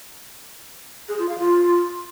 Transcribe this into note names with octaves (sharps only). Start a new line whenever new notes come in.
G#4
F4
F5
F4